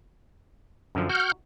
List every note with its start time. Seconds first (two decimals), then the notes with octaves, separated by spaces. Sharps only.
0.95 F#2 D3 F3
1.09 F#4 F#5 F6 G6